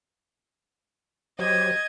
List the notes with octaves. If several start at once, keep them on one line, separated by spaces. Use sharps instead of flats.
F#3 G4 C5 D#5 G#6